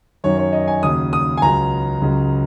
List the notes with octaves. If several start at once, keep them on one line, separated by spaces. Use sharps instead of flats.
F#2 D#3 F#3 C#5
C#5
D#5
G#5
D#2 C#3 F#3 D#6
D#6
G#5
C#2 C#3 F#3 A#5
C#2 C#3 F#3